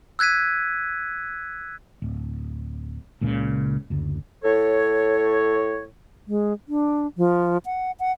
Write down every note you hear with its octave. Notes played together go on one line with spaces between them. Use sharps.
E6 F#6 G#6 B6 D#7
D1
C#2 A#2 C#3
F#1 D2
A2 A4 C#5
G#3
D4
F3
F#5
F#5